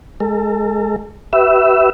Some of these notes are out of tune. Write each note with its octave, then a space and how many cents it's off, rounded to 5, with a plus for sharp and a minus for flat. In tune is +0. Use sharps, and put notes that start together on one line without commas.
G#3 +10 A4 +40
G4 -45 B4 +0 E5 +0